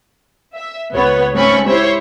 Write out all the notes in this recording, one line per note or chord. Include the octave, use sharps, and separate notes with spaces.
E5
C#2 B3 C#5
G#2 A3 C4 C#4 B5 C#6
E4 G4 C5 C#5 E5